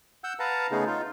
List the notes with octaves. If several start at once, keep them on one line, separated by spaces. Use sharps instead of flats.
F#5 E6 G6
B4 F5 F#5 A5 A#5
C#3 A3 B3 D#4 G#4
D#4 F4